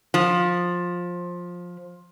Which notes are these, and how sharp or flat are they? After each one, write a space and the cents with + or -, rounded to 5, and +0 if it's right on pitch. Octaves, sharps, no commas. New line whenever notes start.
F3 +15